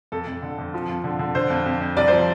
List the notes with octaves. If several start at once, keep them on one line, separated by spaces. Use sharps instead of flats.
F2 A4
F2
D3
F2
F3
F2
D3
D3
D3 C5
F2
F2
F2
C2 D5
F3 C5